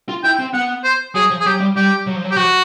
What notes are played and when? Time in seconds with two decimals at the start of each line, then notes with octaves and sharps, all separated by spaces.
0.09 F4
0.24 E4 G5
0.39 C4
0.54 B3 F#5
0.84 C5
1.15 F#3 G#4
1.30 F3
1.41 G#4
1.46 F#3 G4
1.61 G3
1.76 G3 G4
2.07 F#3
2.16 F3
2.25 F#3
2.31 G4
2.36 F3 F#4